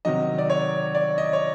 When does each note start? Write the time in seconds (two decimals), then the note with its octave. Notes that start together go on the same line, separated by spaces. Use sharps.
0.05 C3 D#3 F#3 D#5
0.38 D5
0.50 C#5
0.95 D5
1.18 D#5
1.33 C#5